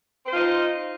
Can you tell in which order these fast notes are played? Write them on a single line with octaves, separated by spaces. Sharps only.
C4 C5 F4 D#4